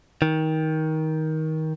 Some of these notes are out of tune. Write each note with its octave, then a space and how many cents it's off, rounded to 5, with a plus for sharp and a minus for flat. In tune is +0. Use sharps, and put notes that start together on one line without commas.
D#3 +20